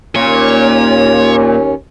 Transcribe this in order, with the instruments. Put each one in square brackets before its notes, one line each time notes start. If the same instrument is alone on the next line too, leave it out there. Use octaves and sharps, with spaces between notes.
[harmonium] D#2 C#4 [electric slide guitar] A#2 [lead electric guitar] C#5